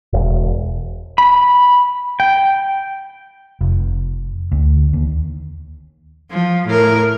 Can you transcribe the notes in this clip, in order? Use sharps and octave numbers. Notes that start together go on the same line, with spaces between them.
E1
B5
G5
F1
D2
D#2
F3
A2 A#4